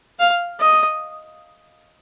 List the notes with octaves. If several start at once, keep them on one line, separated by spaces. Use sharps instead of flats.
F5
D#5